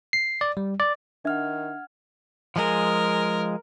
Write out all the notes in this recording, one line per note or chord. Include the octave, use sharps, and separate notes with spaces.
C7
D5
G3
D5
D#3 D4 E5 F#5 F6 G#6
F3 G#3 G#4 A#4